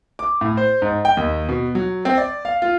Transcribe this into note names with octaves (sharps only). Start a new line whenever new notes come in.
D6
A2
C5
G#2
G5
D#2
B2
F#3
C4
D5
F5
F4